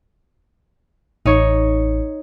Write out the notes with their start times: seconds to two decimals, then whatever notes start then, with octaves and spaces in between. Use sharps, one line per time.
1.26 A1 D#4 C#5